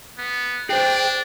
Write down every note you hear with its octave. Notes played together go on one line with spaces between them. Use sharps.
B3
D4 G#4 C5 G5